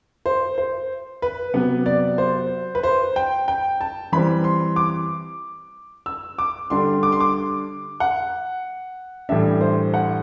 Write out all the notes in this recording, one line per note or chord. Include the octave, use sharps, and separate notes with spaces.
C5
C5
B4
C3 F#3 B3
D5
C5
B4
C5
G5
G5
A5
E3 G3 C4 B5
C6
D6
E6
D6
D3 G3 D4 C6
D6
C6
D6
F#5
A2 E3 G3 D4 E5
C5
F#5